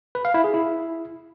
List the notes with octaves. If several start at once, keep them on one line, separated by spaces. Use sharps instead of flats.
B4
F5
E4
G#4
E4